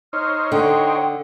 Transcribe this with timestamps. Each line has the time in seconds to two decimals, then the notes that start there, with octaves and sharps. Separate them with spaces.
0.13 D#4 C5 C#5 F6
0.52 D3 G5